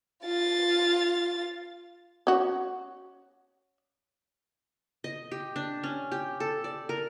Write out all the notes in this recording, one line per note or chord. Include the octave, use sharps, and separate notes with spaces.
F4 A6
C#4 F#4
D#5
G4
D4
C#4
G4
A4
D5
A#4